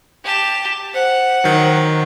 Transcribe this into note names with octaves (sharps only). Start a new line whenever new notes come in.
G4 A5
C5 F#5
D#3 F#3